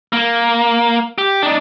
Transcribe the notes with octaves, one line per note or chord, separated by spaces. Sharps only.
A#3
G4
D4 D#4